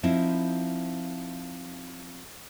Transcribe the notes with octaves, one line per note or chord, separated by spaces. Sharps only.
F3 C4 D#4 E4